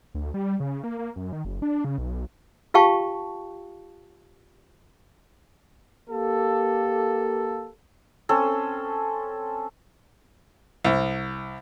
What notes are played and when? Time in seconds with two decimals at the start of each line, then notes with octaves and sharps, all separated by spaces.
0.15 D2
0.34 G3
0.60 C#3
0.84 A#3
0.99 A#3
1.16 F#2
1.33 D#3
1.45 F#1
1.62 D4
1.85 C#3
1.98 B1
2.74 F4 G4 F5 G5 A5 C#6
6.10 A#3 G4 A4
8.29 C4 C#4 A4
10.84 C2